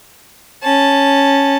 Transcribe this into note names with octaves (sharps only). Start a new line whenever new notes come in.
C#4 A5